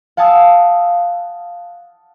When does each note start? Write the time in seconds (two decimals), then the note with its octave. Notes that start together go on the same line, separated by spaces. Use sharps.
0.17 F5 F#5 G#5 A5 D#6 E6